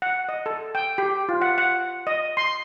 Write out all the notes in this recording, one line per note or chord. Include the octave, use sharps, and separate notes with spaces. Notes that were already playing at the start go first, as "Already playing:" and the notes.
F#5
D#5
A4
G5
G4
F4
F#5
F#5
D#5
C6